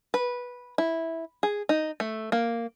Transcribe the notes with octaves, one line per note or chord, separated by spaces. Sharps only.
B4
E4
G#4
D#4
A3
A#3